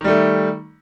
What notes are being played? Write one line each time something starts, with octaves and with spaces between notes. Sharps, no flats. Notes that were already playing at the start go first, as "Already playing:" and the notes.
D#3 G3 A3